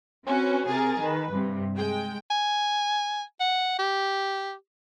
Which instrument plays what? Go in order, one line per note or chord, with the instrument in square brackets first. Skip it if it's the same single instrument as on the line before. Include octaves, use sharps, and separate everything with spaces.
[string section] C4 C#4 F#4 B4
C3 G#4 A#4 A6
D#3 B4
G2 C3
G#3 G5
[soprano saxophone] G#5
F#5
G4